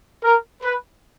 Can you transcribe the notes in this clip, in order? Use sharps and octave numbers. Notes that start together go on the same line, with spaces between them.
A#4
B4